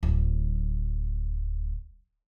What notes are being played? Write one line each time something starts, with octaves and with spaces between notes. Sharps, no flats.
D1 F#3